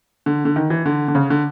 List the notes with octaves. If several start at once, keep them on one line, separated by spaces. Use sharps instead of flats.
D3
D3
D#3
E3
D3
D3
C#3
D3